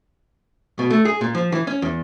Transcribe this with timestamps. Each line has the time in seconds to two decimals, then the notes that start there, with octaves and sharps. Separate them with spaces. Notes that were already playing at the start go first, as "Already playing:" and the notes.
0.79 B2
0.90 A3
1.05 G#4
1.21 A#2
1.35 F3
1.52 E3
1.67 C#4
1.82 E2